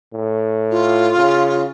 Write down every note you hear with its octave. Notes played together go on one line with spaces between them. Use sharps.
A2
F4
C#3